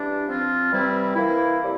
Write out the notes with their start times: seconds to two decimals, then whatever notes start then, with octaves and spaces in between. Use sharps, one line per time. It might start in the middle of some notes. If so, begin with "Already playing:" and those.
Already playing: E3 G3 D4
0.25 F3 C4 F4
0.71 C3 E3 G3 C4 E4
1.16 E3 A#3 E4
1.61 C3 G3